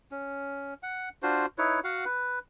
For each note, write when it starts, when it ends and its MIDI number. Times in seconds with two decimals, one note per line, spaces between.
0.11 0.74 61
0.83 1.09 78
1.22 1.46 62
1.22 1.46 65
1.22 1.46 66
1.22 1.46 72
1.58 1.80 63
1.58 1.80 64
1.58 1.80 71
1.58 1.80 73
1.84 2.05 66
1.84 2.05 77
1.84 2.05 78
2.05 2.39 71